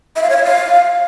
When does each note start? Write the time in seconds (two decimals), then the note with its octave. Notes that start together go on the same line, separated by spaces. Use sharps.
0.16 E5
0.23 F5
0.30 C#5
0.37 E5
0.44 F5